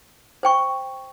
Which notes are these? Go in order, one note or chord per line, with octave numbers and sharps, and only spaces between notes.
C5 G5 C#6